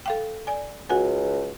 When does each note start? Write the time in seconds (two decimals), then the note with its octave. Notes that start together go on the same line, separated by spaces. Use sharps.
0.06 A4 F5 G5
0.47 D5 G#5
0.89 C#2 F#4 F#5 G#5